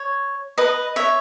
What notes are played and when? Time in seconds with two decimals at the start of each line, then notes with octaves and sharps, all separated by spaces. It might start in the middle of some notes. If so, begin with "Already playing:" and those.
Already playing: C#5
0.58 B4 D#5
0.96 C#5 E5